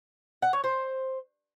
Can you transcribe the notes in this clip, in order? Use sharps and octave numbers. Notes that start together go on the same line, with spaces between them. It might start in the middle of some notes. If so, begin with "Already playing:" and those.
F#5
C#5
C5